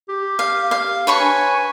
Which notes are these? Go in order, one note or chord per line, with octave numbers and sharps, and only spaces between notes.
G4
F5
F5
D4 B4 C#5 C#6
G#5